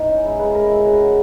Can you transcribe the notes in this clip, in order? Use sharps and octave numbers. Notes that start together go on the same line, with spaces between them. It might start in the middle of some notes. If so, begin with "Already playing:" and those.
Already playing: E3 D#4
C#4
G#3 E4
G#3 B4
G#3 A#4
G#3 E4
C#3 F#4
C#3